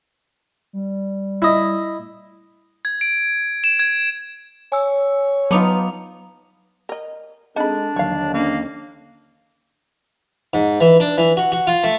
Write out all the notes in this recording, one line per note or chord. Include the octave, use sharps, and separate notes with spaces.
G3
E4 D#5
G#6
D7
E7
G#6
C#5 G#5 E6
F#3 B3 D#4 F4 D6 F7
A#4 D#5
G#3 C4 D4 D#4 A4 A#5 B5
D#2 D3 F3 F#3 C#5 F5
A#3 C#4 D4 D5
G#2
E3
D4
E3
F#4
F#4
F4
A3